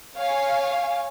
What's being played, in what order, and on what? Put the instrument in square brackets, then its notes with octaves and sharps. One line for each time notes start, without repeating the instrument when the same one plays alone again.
[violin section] C#5 F5 G#5